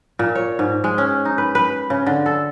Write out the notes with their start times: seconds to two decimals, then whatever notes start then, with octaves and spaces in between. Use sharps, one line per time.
0.19 A#2
0.35 C#5
0.59 G#2
0.84 G#3
0.98 C#4
1.25 D#4
1.38 B4
1.55 B4
1.90 C#3
2.06 D3
2.26 A4